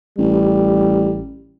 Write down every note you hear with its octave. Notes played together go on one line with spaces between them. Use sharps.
A1 G3